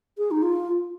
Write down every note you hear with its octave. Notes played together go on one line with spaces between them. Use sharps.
G#4
D#4
F4